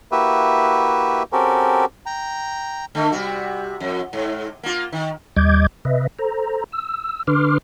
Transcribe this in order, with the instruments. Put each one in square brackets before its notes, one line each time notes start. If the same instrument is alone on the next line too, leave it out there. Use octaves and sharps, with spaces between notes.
[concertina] A#3 E4 F#4 G4 B4 E5
C4 C#4 F#4 G4 A4 A#4
G5 A#5
[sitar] D3 A3
C3 G3 F#4
F2
G#2
A#3 F4
D#3
[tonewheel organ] D#2 G3 D#5 D6 G6 G#6
C3 B4 D#5 E5
A4 C5 A#5
E6
D3 D4 B4 C6 D6 F6